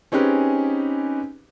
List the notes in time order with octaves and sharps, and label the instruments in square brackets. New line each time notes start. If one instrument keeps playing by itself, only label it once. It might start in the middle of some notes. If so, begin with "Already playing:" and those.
[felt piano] C4 C#4 D#4 G4 G#4 B4